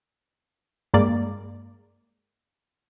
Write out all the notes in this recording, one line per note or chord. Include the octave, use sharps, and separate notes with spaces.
G2 G#3 A#3 D5